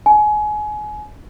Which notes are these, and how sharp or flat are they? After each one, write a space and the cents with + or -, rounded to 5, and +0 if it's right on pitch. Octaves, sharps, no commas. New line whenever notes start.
G#5 +25